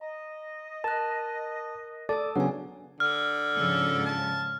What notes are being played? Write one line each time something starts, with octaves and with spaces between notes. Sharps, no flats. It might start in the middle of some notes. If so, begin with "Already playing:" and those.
D#5 A#5
A#4 A5 F#6
A4 D5 A5 D#6
C#3 F#3 B3 D4 F#5 G#5
D3 F6
G#2 C#3 F3 A4
A5